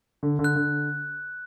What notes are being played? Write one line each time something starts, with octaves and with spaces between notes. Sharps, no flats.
D3
D3
F#6
D3